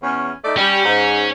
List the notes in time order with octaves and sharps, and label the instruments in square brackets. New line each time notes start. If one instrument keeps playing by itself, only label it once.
[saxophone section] E2 C#4
A3 D#4 D5
[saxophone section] G3 [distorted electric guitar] C#4
[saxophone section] G#2